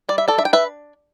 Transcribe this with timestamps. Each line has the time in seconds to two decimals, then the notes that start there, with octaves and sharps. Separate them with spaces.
0.09 G3 D5
0.18 E5
0.28 A4 D5
0.38 D4 E5
0.45 G5
0.53 B4 E5